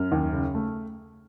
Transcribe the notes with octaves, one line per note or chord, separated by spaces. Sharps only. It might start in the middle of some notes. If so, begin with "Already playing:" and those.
Already playing: F#2 F6
D#2
C#3
A3